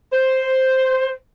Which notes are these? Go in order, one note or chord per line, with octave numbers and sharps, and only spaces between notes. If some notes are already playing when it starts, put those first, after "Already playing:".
C5